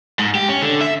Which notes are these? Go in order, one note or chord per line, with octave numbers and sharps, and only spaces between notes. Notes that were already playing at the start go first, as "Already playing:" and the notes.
G#2
G4
C#4
D3
E5